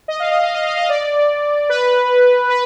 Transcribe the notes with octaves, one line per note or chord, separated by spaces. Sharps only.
D#5
F5
D#5
F5
D#5
F5
D#5
D5
B4
B4